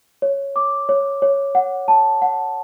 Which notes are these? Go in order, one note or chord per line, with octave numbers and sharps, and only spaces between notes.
C#5
D6
C#5
C#5
F#5
A5
F#5